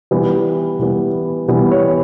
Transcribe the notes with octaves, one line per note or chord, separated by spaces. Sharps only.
E3 G3 B3 B4
E3 G3 B3
E3 G3 B3
C#5